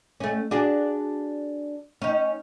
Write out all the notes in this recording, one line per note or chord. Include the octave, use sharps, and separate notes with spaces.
A3 C#4
D4 F#4 G#4
C#4 D#4